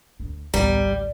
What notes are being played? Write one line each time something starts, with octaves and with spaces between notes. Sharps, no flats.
D2
A1 D2 G3 B3 A#5
A1